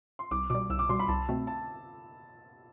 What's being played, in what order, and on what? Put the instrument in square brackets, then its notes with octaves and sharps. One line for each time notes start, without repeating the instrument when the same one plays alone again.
[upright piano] C6
[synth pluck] C2 [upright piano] D6
[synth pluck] B2 G3 [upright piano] D6
[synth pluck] C2 [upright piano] E6
[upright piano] D6
[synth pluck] B2 G3 [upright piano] C6
[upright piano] B5
[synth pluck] C2 [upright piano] A5
[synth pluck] B2 A3 C4
[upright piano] A5